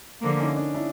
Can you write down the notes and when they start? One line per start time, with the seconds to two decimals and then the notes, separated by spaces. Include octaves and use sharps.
0.21 D3 F3 A#3
0.39 C#4 D#4
0.57 D4
0.74 D4 E4